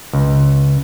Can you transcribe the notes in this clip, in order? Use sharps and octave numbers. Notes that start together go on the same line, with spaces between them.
C#2